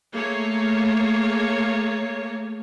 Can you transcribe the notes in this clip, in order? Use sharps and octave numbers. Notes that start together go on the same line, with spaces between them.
A3 A#3 G#4 C#5